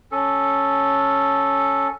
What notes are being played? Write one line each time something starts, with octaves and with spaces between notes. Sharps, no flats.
C#4 A4